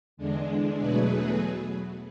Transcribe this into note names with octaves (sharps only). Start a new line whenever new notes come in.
E2 D3 G#3 D4
E2 B2 F#3 A3 G#4 B4